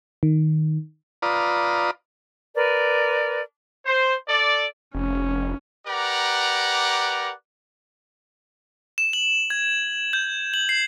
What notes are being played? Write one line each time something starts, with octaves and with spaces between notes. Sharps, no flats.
D#3
F4 B4 D5 A#5 D#6
A#4 B4 D5
C5
A4 D5
F1 C#4
G4 A#4 B4 D5 F#5 A#5
E7
F#7
G#6
G6
F#7
C7